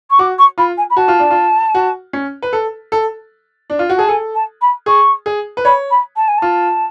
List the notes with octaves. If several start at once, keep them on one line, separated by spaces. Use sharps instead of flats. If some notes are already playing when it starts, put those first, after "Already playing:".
C#6
F#4 D6
C#6
F4 B5
G#5
B5
F#4 A5
F4
D4
F4
F#4
C#4
B4
A4
A4
D4
F4
F#4
G#4 A5
A4 G#5
A5
B5
G#4 C#6
G#4
B4
C#5 B5
B5
A5
G#5
F4 A5